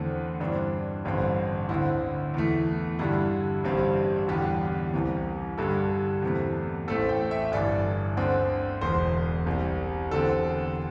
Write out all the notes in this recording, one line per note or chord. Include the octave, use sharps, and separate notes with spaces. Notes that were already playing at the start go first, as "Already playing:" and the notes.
Already playing: E2 D3 A3 C4
G2 E3 C4 D4
A1 G2 D3 C4
D2 D3 C4 E4
E2 E3 A3
G2 D3 G3 E4
A1 G2 G3 C4
E2 D3 G3 G4
C2 C3 E3
G2 D3 G3 A4
E2 C3 A3
A1 A2 A3 C4 A4
G5
E5
G1 G2 E3 D5
D2 D3 C4
E1 E2 E3 C5
C2 C3 G3
E2 D3 C4 A4